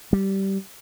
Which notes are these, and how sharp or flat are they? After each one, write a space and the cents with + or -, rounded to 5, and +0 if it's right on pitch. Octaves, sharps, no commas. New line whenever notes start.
G3 -15